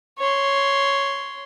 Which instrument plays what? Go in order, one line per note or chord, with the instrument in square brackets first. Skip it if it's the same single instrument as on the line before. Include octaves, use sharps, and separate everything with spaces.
[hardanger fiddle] C#5 C6